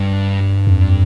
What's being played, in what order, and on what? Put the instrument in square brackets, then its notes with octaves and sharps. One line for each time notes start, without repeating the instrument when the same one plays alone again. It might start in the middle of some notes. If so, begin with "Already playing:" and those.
Already playing: [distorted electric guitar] G2
[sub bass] F2